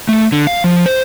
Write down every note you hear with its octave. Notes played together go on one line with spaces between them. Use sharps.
A3
D3
F5
F3
C5